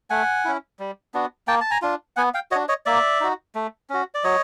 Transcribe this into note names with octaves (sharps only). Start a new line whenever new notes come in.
A3 F#5 G#5
C#4 E4
G3
B3 D4 F#4
A#3 G5 A5
A5
G#5 A#5
D4 F4
B3 F#5 G#5
F5 G5
D4 F#4 C#5 D#5
C#5 D#5
A#3 D5 E5
D#4 F#4
A3
C#4 F#4
D5
F#3 C#5 D#5